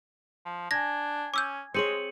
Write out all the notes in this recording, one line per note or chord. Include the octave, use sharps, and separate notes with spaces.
F3
D4 G#5 G#6 A#6
C#4 D6 E6 G6
G#3 C4 G#4 C#5 C#7 D#7 F#7